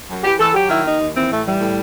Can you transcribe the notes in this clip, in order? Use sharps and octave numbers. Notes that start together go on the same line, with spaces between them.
F#2
E3 G4
E3 A4
F#3 G4
D#3 E4
D#2 D#4
D#2
E3 C4
A2 A3
E3 G3
A2